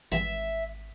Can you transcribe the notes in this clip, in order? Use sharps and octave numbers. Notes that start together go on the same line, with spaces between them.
G#1 E5